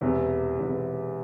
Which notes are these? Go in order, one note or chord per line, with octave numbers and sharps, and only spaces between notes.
E1 E2 C3
E1 E2 C3